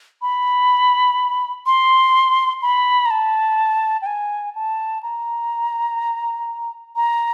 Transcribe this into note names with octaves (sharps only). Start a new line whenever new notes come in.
B5
C6
B5
A#5
A5
G5
G#5
A5
A#5
A#5